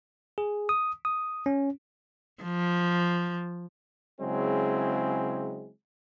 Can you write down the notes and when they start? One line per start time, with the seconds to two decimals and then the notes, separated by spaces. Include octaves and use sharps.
0.38 G#4
0.69 D#6
1.05 D#6
1.46 C#4
2.43 F3
4.21 C#3 F#3 G#3 C4 E4 G#4